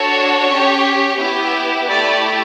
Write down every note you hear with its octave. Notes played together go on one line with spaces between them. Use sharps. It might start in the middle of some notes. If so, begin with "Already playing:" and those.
Already playing: D4 F#4 A4 C#5
C#4 G4
B3 E4 G4
A3 E4 G4 D5